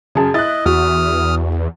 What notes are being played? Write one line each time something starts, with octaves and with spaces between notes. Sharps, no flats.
F#2 C#3 G#4 A5
E4 D#5 F#6 A6
E2 F#4 D#6 F6